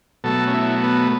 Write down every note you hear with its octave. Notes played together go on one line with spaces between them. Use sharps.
B2 F#3 A3 A4
C#4
E4
B3